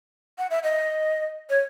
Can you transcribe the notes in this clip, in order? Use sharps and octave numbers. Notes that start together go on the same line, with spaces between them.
F#5
E5
D#5
C#5